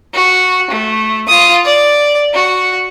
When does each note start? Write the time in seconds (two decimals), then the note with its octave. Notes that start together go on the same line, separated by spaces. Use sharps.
0.14 F#4
0.71 A3
1.28 F4 D#6
1.65 D5
2.34 F#4